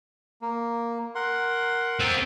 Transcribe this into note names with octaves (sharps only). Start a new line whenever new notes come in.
A#3
A#4 F#5 C6
C4 A4